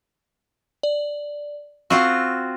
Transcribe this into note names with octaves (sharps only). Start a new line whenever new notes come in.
D5
C4 F4 F#4 C#6 E6